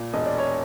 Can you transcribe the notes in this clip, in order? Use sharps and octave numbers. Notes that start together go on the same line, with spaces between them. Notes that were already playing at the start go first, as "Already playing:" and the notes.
Already playing: A#2
E1 D#5
D5
C#5